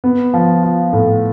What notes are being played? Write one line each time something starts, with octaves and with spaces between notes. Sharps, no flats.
B3
F3
F4
A2